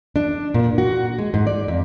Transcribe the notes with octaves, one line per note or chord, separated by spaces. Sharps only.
D4
A#2
F#4
G#3
G#2
D5
F2